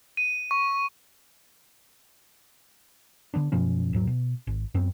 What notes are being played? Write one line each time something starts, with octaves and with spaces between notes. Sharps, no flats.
D#7
C#6
D3 E3 B3 D4
F#2 B2 F3 C#4
D#1 G#2 F#3
B2
G#1
F#2 B3 C4